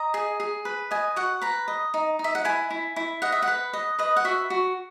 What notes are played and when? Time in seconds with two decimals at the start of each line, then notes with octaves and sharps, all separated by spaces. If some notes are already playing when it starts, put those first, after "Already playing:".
Already playing: D#5 A#5
0.14 G#4
0.40 G#4
0.65 B4
0.91 D#5 G#5
1.16 F#4 F#5
1.42 B4 A#5
1.68 D#5
1.94 D#4
2.19 D#4
2.24 E5
2.35 F#5
2.45 E4 G#5
2.71 E4
2.96 E4
3.22 D#5 F#5
3.32 E5
3.42 F#5
3.48 B4
3.73 D#5
3.99 B4 D#5
4.16 F#5
4.25 F#4 E5
4.50 F#4